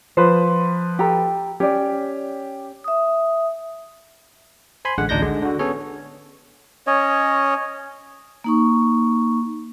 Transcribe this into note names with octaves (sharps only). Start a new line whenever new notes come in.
F3 B4 C5
G4 A4 A#5
C#4 G4 D5
E5 D#6
C5 G#5 B5 C6
A1 D3 G#3 F#5
A1 D2 D4 D#4 G6 A#6
D3 G#3
D3 F#4
B3 C#4 G#4 A4 C#5
C#4 C#5 D#5
A#3 D#4 C#6